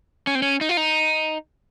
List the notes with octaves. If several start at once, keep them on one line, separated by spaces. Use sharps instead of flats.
C#4
C4
C#4
D#4
F4
D#4